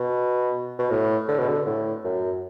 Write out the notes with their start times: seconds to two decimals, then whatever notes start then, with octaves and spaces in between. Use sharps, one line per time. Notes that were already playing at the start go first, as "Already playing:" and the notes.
Already playing: B2
0.79 B2
0.91 A2
1.28 D3
1.39 B2
1.49 D3
1.67 A2
2.04 F#2